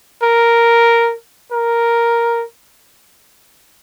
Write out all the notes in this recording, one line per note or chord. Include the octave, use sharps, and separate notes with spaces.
A#4
A#4